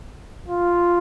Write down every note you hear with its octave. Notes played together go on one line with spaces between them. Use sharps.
F4